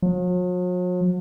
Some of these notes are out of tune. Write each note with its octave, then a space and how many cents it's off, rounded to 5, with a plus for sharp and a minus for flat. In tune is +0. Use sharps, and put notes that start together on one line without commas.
F#3 -45